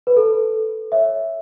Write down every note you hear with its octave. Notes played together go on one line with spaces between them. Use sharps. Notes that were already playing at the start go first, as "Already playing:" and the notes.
B4
A4
C#5 E5